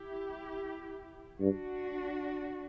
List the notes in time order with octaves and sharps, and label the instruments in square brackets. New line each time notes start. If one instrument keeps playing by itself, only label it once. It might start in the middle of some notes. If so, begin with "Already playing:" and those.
Already playing: [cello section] E4 G4
[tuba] G2 [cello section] D4 F#4